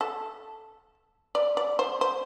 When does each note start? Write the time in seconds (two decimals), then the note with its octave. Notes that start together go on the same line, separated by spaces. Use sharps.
0.01 A4
1.35 D5
1.57 D5
1.79 C5
2.01 C5